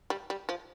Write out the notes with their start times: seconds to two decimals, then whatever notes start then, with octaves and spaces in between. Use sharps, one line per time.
0.10 G3
0.30 G3
0.49 F3